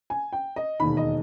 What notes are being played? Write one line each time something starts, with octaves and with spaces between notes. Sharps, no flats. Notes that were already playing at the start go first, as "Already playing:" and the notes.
G#5
G5
D#5
E1 D#2 D#3 B5
D#5